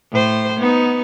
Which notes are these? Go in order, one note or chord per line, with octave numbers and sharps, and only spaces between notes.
A2 C5
B3 D#4